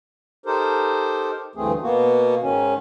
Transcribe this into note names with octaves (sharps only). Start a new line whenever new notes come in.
D#4 G4 A4 A#4 C5
D2 G2 E3 A3 C4 G#4
B2 A#3 B3 F#4
G#2 D#3 C#4